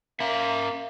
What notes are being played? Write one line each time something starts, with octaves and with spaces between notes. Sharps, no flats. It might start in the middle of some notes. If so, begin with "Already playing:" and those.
A#3 C#4 E5